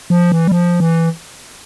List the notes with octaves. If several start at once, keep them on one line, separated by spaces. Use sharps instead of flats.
F3
E3
G3
F3
E3